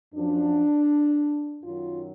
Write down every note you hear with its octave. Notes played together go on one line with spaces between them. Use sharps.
F#2 F3 D4
F#2 D#3 F#3 F4